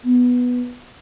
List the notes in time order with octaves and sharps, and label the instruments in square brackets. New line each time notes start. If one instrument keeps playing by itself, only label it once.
[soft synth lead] B3